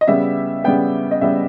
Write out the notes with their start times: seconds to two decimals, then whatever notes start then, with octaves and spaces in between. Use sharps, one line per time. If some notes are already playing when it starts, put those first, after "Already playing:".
0.01 D#5
0.08 C#3 G3 B3 E5
0.64 C#3 G3 B3 G5
1.11 D#5
1.21 C#3 G3 B3 E5